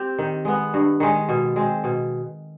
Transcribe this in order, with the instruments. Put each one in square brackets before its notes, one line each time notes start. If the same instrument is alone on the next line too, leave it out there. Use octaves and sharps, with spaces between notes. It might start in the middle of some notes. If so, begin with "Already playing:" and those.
Already playing: [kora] C4 G4
D#3
G#3 B3
G2
D#3 G#3
B2
G#3 C4
B2